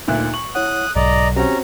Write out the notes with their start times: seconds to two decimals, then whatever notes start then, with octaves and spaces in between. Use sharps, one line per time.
0.08 D2 A#2 D#4 F#6
0.34 C#6 F#7
0.55 E4 C#5 F#5 D#6 F#6
0.96 B1 G#2 D5 D#5 A#5
1.36 C4 C#4 F#4 G4 A#5